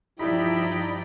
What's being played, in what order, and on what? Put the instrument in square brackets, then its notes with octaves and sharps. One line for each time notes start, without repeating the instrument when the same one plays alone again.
[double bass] G2 F3 [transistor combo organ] D#4 B5 [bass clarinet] E4 [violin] G4 D5